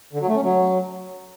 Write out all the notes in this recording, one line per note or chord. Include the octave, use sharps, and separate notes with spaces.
D3
F#3
A3
C#4
F#3